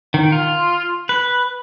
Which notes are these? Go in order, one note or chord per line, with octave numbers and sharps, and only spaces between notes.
D#3
F4
B4